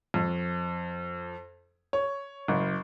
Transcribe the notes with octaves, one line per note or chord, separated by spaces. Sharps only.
F2
C#5
F#1